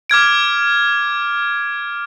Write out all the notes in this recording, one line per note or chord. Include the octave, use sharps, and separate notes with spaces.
D6 F6 G#6 D7